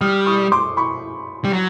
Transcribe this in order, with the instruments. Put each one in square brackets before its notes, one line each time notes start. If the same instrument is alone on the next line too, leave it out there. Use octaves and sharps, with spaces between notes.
[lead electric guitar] G3 [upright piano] D#6 F6
[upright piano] C#6 D#6
C6 D6
B5 C#6
[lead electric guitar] G3
F#3